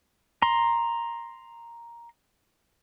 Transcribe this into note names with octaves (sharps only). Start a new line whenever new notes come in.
A#5 C6